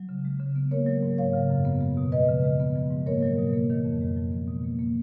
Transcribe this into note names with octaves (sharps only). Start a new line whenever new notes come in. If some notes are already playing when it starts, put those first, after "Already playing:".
Already playing: F#3
C#3
G#3
C#3
B3
A#3 A#4 C#5
F#3
G#2
F#3 C#5 F5
C#3
F#2
B3
G#3
B2
F3 B4 D#5
C#3
G#3
B3
F3
G#2
A#3 A#4 C#5
F#3
B2
A#3
D#3
F2
G#3
F3
B3
B2
A#3
A#3